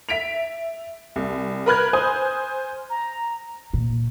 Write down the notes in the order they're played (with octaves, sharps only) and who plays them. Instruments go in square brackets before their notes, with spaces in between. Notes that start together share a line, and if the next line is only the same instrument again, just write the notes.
[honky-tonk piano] E5 B6 D7 F7
C2
A#4 B4 B5 F6 F#6 G#6
C5 G#5 D#6
[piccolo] A#5
[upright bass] A#2